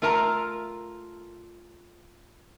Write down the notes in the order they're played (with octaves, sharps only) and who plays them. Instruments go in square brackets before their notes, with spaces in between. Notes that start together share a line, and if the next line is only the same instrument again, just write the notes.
[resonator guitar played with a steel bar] A3 F4 A#4 A5 A#5